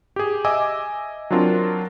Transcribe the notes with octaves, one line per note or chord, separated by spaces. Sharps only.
G4 G#4
D#5 E5 G#5 D6 E6
F#3 C4 D4 F4 A#4